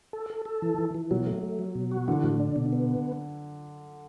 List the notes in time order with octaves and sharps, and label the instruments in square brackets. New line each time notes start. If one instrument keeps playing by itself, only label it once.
[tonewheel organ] A4
A4
A4
E3
E3
E3
[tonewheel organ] B2 [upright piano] F#3
[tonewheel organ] A3
A3
F#3
B2
F#4
[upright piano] D3 [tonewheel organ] E3
[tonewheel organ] A2
D4
B2
B3